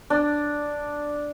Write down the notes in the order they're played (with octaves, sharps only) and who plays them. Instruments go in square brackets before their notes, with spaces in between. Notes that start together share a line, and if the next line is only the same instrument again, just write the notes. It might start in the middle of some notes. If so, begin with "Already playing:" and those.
[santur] D4